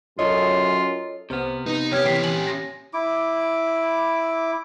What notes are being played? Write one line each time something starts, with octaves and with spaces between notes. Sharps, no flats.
F#2 F4 A4 C#5 D#5
C2 C3 B3 C5 F6
D#4 B4
G4 C#5 F6 G#6
E3 C#4 G4 G5 B6 C7
G#5 F#7
A#6
E4 D6